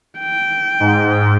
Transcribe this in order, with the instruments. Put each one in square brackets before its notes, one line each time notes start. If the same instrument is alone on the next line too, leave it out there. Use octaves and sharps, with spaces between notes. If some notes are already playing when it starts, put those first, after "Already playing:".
[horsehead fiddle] G5
[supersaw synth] G#2